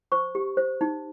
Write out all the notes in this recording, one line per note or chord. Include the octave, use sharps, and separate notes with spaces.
C5 C#6
G4
C5
D#4